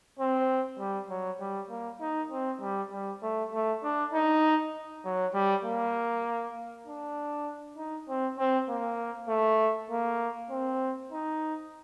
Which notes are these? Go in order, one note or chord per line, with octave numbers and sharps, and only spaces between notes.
C4
G3
F#3
G3
A#3
D#4
C4
G3
G3
A3
A3
D4
D#4
F#3
G3
A#3
D4
D#4
C4
C4
A#3
A3
A#3
C4
D#4